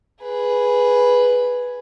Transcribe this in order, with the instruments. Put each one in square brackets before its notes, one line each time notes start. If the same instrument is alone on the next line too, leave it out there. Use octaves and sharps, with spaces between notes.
[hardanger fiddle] G#4 B4